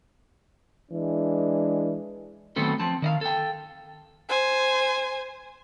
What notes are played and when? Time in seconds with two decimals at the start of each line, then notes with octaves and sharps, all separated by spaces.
0.92 E3 G#3 D4
2.56 D#3 F#3 A3 B3 C4 A4
2.80 F3 C4 A5
3.02 D#3 D#5 F5
3.21 A4 G5
4.29 C5 G#5